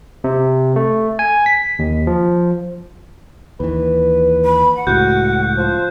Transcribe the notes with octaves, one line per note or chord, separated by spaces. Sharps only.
C3
A3
G#5
B6
D#2
F3
D#2 E3 B4
B5
F#5
C#2 A2 F#4 F#6 G6
F3 C5